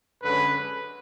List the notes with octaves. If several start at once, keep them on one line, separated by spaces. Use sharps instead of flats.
F#2 D3 G#3 C#4 B4